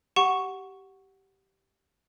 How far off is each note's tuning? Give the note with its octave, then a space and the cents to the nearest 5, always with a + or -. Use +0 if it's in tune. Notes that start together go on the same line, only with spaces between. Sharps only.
G4 -15 F#5 +0 C#6 +0